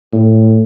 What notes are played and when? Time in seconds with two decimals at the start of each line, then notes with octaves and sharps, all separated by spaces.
0.13 A2